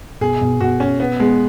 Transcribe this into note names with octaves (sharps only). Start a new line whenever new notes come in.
B2 G#4
B2
B2 F#4
B2 C#4
B3 B4
G#3 B3